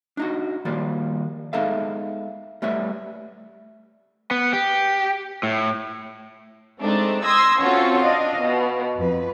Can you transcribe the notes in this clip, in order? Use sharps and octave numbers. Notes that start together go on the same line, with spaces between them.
D4 D#4 F#4
D#3 F3 G3 A#3 D5
G#3 B3 D#4 A4 E5 F5
G3 A3 B3 C#5 E5
B3
G4
A2
G#3 A3 C4 D4 D#4
C6 D#6 E6 G#6 A#6
C4 C#4 F4 F#4 A4 C#5
D4 D#5 F5
B2
F2 B4